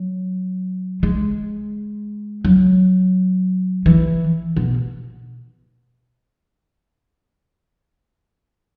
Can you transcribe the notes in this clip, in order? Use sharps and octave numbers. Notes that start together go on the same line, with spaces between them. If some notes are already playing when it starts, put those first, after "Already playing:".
Already playing: F#3
G#3
F#3
E3
B2